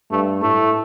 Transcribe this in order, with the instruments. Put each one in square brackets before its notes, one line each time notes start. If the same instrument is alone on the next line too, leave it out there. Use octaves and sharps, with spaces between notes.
[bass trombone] G2 [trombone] A3
[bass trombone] A2 [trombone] A3